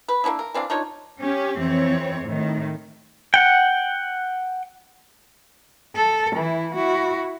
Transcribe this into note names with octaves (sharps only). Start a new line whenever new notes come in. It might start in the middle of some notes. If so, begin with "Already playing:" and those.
B4
A#3 C#4 D4 E4
A#4
E3 C4 D4 F5
D4 D#4 F4 C#5
C#4 G4
F2 E3 C4 C#5
A2 D#3
F#5 G5
A4
E3 E4
E4 F#4